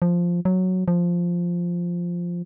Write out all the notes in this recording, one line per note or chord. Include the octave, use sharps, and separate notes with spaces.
F3
F#3
F3